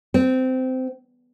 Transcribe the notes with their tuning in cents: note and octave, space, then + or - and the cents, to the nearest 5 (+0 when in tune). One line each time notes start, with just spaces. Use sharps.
C4 -20